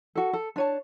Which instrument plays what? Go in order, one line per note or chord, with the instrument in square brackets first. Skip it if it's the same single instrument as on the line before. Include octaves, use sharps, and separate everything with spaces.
[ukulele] F#4 A4
A4
D4 C#5 A5